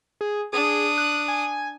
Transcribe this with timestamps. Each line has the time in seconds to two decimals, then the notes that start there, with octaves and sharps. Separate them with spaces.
0.21 G#4
0.53 D4 G#4 D#6
0.98 F#6
1.28 G#5